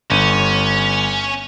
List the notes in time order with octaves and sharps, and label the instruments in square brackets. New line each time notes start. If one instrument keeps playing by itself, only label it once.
[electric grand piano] G1 D#7 [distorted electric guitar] C#4